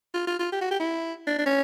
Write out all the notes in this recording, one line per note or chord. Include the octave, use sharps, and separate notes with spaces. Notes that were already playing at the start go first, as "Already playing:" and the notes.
F4
F4
F4
G4
F#4
G4
E4
D4
D4
C#4